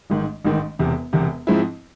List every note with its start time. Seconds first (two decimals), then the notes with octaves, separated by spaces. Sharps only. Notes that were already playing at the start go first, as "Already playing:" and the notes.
0.10 A1 G#2 D#3
0.45 A1 G#2 D#3
0.79 E1 E2 C3
1.13 E1 E2 C3
1.47 G#2 F3 G#3 C4 E4